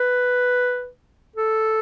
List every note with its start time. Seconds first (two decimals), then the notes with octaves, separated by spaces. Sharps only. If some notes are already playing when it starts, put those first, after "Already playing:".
Already playing: B4
1.36 A4